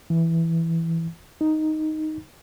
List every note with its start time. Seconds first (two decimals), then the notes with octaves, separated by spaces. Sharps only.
0.10 E3
1.41 D#4